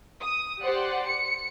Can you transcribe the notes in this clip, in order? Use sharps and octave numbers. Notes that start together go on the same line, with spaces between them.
D#6
G4 C5 D5 F#5
C#7